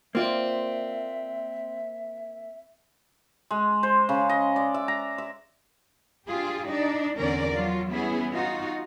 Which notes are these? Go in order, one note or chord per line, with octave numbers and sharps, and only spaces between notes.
A#3 C4 F4 D5 E5
G#3
C5
C#3
D#5
D5
E5
A#5
E5
D4 F4 G4 G#4
D4 D#4 D5
E2 D3 C4 C#4 A#4 D5
F3 F#3 F4
E3 G3 B3 C#4 E4 G#4
D#4 F4 F#4